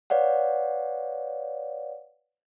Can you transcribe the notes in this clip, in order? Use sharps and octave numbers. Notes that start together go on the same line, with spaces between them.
B4 C#5 D5 F5 F#5